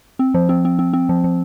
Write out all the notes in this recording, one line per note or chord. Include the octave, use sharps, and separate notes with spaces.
C4
F3
C4
C4
C4
C4
F3
F3